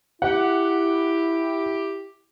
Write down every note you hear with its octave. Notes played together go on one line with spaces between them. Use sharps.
E4 G4 F#5